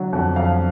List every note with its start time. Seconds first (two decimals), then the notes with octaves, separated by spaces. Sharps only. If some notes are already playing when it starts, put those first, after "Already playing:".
Already playing: D3 F#3
0.13 F2
0.36 F2 F5